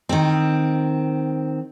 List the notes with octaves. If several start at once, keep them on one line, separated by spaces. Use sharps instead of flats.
D#3 C4